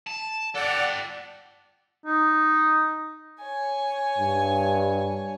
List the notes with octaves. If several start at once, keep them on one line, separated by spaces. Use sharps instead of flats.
A5
A4 D5 F#5 G5
D#4
C#5 G#5
G2